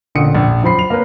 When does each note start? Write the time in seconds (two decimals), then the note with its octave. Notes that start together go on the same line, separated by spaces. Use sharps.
0.15 A1 A#2 D3 D#6 C#7
0.35 A#1
0.63 F#2 F3 C5 B5 C7
0.79 F7
0.90 A#3 C4 A#4 B4 C#5